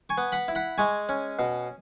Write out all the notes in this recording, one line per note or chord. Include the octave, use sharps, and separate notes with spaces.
G#5 C#6
B3
F#5 B5
E4
F#5 B5
G#3 G#5 C#6
C#4
B2